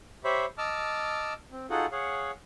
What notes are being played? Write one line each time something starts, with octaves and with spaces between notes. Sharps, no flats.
G4 C5 C#5 E5 B5
D#5 A5 D6 E6 F6
C4
D#4 F4 F#4 G#4 A4 F#5
G#4 C#5 F5 F#5